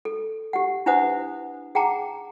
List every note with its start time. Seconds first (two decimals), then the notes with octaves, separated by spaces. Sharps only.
0.05 A4
0.53 G4 F#5
0.86 D4 E4 B4 C5 F#5 D#6
1.75 G#4 F#5 G5 A5 A#5 D6